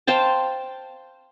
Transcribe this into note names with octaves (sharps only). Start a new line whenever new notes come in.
C5 F5 G5 A5